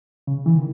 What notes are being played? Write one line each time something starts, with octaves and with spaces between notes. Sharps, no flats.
C#3
E3
D#3